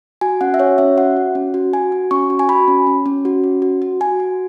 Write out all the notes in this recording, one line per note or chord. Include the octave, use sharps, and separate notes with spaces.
F#4 G#5
C#4 F#5
E5
F#4 C#5
C#4 E5
F#4 F#5
F#4
C#4
F#4
F#4 G#5
F#4
C#4 C#6
F#4
G#5
F#4 B5
C#4
C#4
C#4
F#4
C#4
F#4
F#4
F#4 G#5
F#4